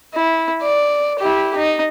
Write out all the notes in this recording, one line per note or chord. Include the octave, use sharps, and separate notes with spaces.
E4
D5
E4 G4
D#4